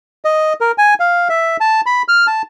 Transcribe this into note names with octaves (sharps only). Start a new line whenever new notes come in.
D#5
A#4
G#5
F5
E5
A5
B5
F6
A5